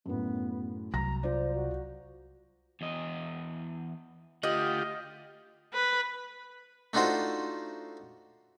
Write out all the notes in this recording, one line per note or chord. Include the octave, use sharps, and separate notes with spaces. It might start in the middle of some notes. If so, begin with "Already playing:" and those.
F#2 A2 B3
C2 F#3 A#5 A#6
F4 C5 D5
F#4
E2 D#5
D2 F4 G4 D#5 F#5
B4
A3 D4 D#4 F4 F#4 C5